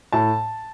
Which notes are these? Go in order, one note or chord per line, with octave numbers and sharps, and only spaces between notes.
A2 A5